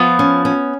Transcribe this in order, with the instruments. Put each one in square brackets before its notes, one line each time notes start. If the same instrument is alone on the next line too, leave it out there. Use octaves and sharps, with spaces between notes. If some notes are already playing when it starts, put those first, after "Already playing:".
Already playing: [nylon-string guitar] F3 [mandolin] B3
[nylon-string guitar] C#4
C#4